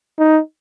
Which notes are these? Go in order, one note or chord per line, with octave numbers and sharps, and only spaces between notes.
D#4